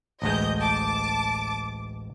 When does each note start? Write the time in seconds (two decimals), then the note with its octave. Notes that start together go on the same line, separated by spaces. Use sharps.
0.22 A1 D2 G#3 D#5 G6
0.59 A5 D6